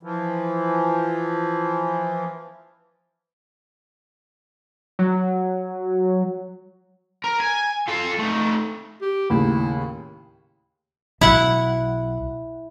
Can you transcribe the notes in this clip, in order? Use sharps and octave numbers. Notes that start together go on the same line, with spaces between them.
E3 F3
F#3
A#4
G#5
F4 A4
A3 D#4
G4
D#2 A2 C#3 E4
B1 E4 F#5